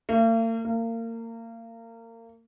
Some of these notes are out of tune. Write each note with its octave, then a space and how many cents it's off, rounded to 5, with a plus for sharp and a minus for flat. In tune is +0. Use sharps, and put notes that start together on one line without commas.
A#3 -45
A#3 -30